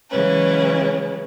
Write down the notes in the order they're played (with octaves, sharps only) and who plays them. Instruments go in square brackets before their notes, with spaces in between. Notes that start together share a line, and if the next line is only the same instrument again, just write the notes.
[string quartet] C#3 E3 F#3 G#3 C#4 B4